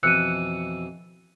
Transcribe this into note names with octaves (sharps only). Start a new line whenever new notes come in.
F2 B2 E3 E6 F#6 C#7 D#7